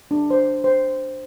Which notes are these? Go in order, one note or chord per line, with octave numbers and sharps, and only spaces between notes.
D4
C5
C5